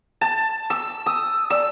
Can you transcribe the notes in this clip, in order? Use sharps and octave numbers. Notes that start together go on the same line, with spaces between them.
A5
E6
D#6 E6
D5 E6